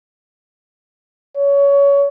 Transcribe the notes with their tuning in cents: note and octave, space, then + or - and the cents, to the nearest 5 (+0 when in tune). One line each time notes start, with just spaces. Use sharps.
C#5 +20